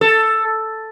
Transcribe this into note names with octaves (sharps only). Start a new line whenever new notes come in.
A4